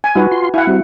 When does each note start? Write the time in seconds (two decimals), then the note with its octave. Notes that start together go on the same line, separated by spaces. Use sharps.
0.04 G#5
0.15 G3 D#4 F4 F#4 B4
0.31 F4 C6
0.54 E4 F5 F#5 G#5
0.67 G3 C4 F#4